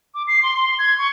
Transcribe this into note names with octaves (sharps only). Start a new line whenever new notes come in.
D6
C7
C6
C6
G#6
C#6